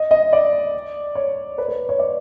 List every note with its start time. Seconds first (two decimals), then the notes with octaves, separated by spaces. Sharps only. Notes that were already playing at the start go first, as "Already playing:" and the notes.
Already playing: D#5
0.11 D#5
0.33 D5
1.15 C#5
1.58 B4
1.68 B4
1.89 C#5
1.99 D5